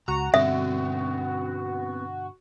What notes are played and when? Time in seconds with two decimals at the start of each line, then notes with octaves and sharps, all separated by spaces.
0.08 C#2 F#4 A#5
0.34 G2 B2 D3 B3 C4 E5